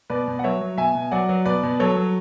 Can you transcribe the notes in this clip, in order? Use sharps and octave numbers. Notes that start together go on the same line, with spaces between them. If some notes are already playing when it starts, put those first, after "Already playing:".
B2 B4 D5
B2
F#5
F#3 C#5 E5
F#3
B2 E5 G#5
B2
F#3 D5 F#5
F#3
B2 B4 D5
B2
F#3 A4 C#5
F#3